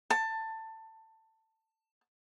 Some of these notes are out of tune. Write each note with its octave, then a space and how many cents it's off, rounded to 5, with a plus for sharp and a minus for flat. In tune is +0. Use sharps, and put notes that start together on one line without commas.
A5 +20